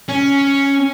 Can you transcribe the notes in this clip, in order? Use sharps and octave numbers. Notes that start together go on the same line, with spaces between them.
C#4